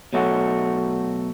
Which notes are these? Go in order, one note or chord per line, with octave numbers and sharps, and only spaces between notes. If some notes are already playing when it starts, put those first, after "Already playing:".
B2 F#3 A3 F#4